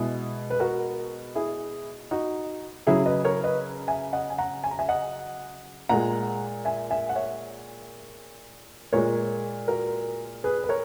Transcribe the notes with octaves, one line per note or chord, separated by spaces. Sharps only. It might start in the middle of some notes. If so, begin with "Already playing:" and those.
Already playing: B2 G#3 E4 G#4
B4
F#4 A#4
E4 G#4
D#4 F#4
C#3 F#3 E4 G#4
B4 D#5
A#4 C#5
B4 D#5
E5 G#5
D#5 F#5
G#5
F#5 A#5
G#5
A#5
E5 G#5
D#5 F#5
A#2 G#3 F#5 A#5
E5 G#5
E5 G#5
F#5
C#5 E5
A#2 G#3 A#4 C#5
F#4 A#4
G#4 B4
B4
A#4 C#5